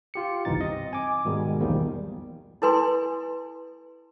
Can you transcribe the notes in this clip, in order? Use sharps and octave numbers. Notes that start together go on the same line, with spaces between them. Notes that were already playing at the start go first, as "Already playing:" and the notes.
F4 G4 C#7
G1 C2 E3 D#4 A6
C4 D#5
G#5 D6
G#2 B2 D#3 G3 G#3
B1 E2 D#3 F3 G3 A#3
E4 A4 B4 G#5 C6